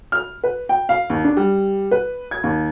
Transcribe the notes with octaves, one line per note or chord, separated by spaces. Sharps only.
F6
B4
G5
F5
D#2
D4
G3
B4
G#6
D#2